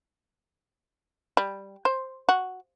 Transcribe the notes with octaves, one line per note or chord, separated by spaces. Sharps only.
G3
C5
F#4